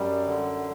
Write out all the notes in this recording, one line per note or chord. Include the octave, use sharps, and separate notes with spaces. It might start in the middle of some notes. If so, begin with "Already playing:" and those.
Already playing: F#2 G3
D3